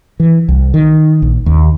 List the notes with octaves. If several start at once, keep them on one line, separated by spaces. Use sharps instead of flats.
E3
C2
D#3
A#1
D#2